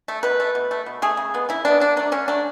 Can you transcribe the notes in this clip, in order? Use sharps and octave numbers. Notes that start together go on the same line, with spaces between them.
A3
B2 B4
A3
B2
A3
B2
A3 G#4
C#3
G#3 B3
C#3 E4
G#3 B3 D4
D3 D4
F#3 A3 D4
D3 C#4
F#3 A3 D4